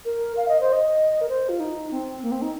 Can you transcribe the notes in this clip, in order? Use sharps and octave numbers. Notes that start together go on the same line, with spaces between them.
A#4
F5
D#5
C5
D#5
A#4
C5
F4
D#4
C4
A#3
C4
D#4